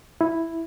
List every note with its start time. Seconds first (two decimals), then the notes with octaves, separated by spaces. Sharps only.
0.21 E4